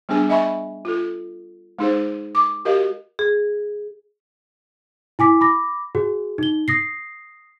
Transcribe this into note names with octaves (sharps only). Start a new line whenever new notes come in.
G3 B3 D4 G#4 G#5
D#5 E5 G#5 B5 C#6
F4 A4
G#3 D#4 G#4 C5
D6
F#4 G4 A#4 D#5 F5
G#4
E4 G#5 D6 B6
B5 D6 A#6
F#4 G#4
D#4 G7
D#6 A#6 C7